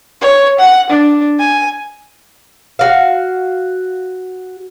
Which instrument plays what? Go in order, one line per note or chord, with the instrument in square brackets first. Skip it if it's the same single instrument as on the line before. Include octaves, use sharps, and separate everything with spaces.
[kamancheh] C#5
F#5
D4
G#5
[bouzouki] F#4 F5